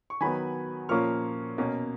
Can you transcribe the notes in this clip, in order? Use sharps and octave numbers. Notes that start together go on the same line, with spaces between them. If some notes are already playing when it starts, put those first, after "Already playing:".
C#6
D#3 F#3 B3 G#5 B5
A#2 F3 A#3 C#4 C#6 F6
B2 A#3 C#4